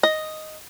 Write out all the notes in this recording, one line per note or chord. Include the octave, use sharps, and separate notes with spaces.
D#5